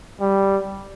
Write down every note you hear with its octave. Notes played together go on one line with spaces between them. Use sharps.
G3